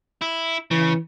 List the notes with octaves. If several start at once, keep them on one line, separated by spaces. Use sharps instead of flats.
E4
C#3 E3